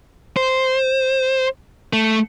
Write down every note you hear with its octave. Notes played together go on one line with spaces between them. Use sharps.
C5
A3